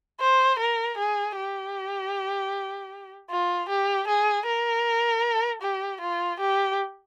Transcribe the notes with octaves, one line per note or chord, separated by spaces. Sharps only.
C5
A#4
G#4
G4
F4
G4
G#4
A#4
G4
F4
G4